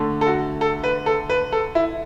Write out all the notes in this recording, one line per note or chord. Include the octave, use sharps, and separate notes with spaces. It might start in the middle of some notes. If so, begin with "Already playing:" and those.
Already playing: D3 A3
A4
F#4
A4
B4
A4
B4
A4
E4